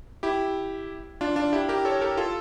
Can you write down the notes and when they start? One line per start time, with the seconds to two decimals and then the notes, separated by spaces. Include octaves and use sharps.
0.23 E4 G4
1.21 D4 F4
1.36 D4 F4
1.53 E4 G4
1.69 G4 A#4
1.85 A4 C#5
2.01 G4 A#4
2.17 F4 A4